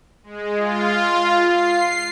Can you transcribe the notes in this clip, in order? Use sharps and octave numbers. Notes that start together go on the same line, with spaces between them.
G#3
F4
C7